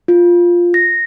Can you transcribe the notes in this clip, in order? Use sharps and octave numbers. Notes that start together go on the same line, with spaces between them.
F4
A#6